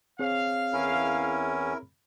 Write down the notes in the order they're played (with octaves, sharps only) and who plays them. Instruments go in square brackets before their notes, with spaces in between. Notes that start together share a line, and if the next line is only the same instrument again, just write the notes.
[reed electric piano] C4 G#4 C#5 [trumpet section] F5
[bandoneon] E2 C#4 [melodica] E4 A#4